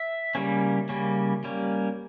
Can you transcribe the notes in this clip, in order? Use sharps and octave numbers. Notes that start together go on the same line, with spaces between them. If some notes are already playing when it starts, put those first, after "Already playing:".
Already playing: E5
C#3 G3 A#3 C#4
C#3 G3 A#3 C#4
G3 A#3 C#4